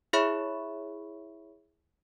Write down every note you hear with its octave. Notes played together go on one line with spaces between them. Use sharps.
E4 G#4 C#5 E5 B5 C#6